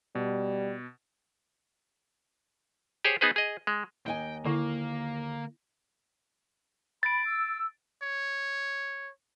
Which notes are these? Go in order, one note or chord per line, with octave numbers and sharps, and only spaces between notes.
B2 G3
G4 G#4 C5 C#5
B3 D#4 G#4 B4 C5
G#4 D#5
G#3
D#2 D#5 G5 G#5
D3 A#3 E4 C#6
B5 A6 D7
E6
C#5